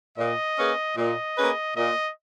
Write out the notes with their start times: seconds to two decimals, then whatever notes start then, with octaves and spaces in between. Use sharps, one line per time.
0.18 A#2 D#5
0.58 A#3 C#4 G#4 B4
0.97 A#2 D#5
1.37 A#3 C#4 G#4 B4
1.76 A#2 D#5